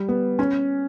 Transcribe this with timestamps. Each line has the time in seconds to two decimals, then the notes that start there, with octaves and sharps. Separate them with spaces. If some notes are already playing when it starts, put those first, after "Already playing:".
Already playing: G3
0.08 B3
0.39 C#4